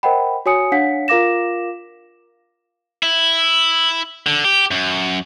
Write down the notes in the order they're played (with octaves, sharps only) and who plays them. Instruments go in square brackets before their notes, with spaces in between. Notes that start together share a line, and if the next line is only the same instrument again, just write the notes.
[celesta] A#4 C5 D#5 F#5 G5 B5
F#4 C#5 G#5 D#6 C#7
D4 C#5 F5 F#5 B6
F4 A#4 F5 D6 A#6 E7
[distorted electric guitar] E4
D3
G4
F#2